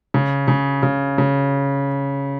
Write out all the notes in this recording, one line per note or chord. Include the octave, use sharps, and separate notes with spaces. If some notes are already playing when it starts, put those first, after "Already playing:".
C#3
C#3
C#3
C#3